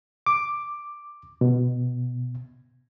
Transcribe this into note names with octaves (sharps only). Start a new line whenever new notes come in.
D6
B2